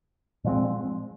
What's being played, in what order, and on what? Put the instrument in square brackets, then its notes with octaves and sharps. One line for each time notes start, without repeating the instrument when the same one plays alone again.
[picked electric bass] A#2 F3 G#3 C4